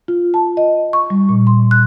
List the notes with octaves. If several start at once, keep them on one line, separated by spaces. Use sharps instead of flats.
F4
A5
D#5
C#6
G3
A#2
C6
F#6